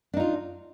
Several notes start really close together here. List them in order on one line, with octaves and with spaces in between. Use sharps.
D4 D#4 F4